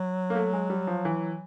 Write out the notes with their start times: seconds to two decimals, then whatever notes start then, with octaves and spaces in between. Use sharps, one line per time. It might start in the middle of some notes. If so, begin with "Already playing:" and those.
Already playing: F#3
0.30 A#3
0.35 A3
0.53 G#3
0.70 G3
0.87 F3
1.05 E3